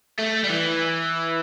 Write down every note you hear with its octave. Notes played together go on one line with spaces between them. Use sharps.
A3
G3
E3